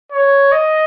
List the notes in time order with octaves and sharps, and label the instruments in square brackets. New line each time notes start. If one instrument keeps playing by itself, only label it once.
[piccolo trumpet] C#5
D#5